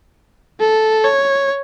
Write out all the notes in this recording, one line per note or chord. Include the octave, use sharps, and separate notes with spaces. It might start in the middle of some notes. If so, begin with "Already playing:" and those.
A4
C#5